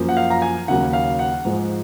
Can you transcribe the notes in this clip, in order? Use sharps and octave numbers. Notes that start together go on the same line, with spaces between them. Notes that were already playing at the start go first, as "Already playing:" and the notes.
Already playing: F#2 F3 A#3
F#5
F5
A#5
G#5
D#2 C#3 F#3 A#3 F#5
F5
F#5
G#2 F3 G#3